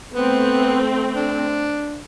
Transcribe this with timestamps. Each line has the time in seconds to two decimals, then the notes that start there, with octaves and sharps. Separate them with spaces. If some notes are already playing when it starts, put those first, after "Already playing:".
0.14 A3 B3 C4
1.15 D4